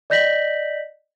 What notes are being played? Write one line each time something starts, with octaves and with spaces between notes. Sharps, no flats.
D5 D#5 G6 A#6 B6 F#7